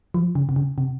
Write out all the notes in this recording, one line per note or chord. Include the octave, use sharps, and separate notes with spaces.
F3
C#3
C3
C#3
C3